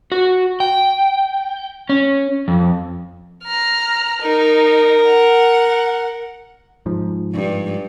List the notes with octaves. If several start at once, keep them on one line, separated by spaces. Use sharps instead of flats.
F#4
G5
C#4
F2
A#5 F6
D#4 A#4
F#5
G#2 F3
G2